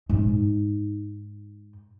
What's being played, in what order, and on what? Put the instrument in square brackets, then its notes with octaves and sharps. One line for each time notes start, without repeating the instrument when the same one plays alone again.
[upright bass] G#2 D#4